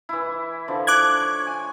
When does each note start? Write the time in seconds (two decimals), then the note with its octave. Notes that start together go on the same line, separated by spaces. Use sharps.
0.09 E3 E4
0.68 D3 F3
0.87 D6 F#6 G#6
1.21 C#5
1.47 G#5